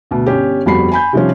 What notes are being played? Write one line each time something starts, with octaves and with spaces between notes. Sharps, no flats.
D2 B2
G1 C#4 G4
G1 F2 G3 F#4 B5 C7
G#5 B5 G6
C3 D#3 F3 G3 C#4